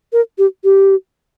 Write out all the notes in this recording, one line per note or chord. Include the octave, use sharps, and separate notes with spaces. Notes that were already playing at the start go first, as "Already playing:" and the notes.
A#4
G4
G4